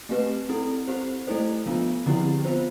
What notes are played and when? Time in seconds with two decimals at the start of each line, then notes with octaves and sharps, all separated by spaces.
0.09 A3 C4 G4 B4
0.49 C4 E4 A4
0.88 C4 G4 C5
1.27 A3 E4 A4 C5
1.66 F3 B3 D4 F4
2.06 D3 F3 C4 E4 G4
2.45 B3 F4 C5